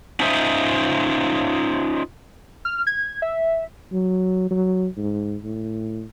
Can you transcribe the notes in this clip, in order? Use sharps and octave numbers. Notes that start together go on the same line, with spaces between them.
C#4 D#4 F4 C5 D#5 E5
F6
G#6
E5
F#3
F#3
G#2
A2